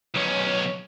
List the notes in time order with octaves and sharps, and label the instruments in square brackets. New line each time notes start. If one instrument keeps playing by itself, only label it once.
[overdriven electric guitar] B1 C#4